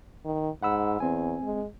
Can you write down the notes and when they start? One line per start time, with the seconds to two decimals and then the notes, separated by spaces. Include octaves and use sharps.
0.25 D#3
0.63 G#2 F#5 B5 E6
1.00 E2 C4 G#5
1.44 G#3